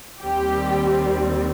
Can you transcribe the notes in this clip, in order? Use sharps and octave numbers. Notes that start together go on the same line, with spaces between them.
D#2 D#3 G3 C4 G4